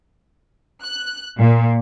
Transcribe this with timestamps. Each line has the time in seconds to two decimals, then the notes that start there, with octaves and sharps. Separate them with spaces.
0.84 F#6
1.38 A#2